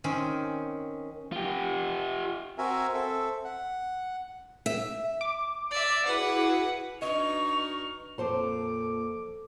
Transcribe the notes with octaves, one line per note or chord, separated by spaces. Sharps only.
D#3 C4 C#4
F4 G4
C4 F#4 A#4 E5 G#5
C4 A4 E5
F#5
E5
D6
D5 E5
E4 F#4 G#4 B4 F#5
D4 D#4 F#4 B4 D#5 C#6 F6
F2 A#2 A4 C5 A5 D6